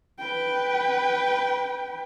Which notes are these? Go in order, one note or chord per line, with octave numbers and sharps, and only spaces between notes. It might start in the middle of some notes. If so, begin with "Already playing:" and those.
B4 G5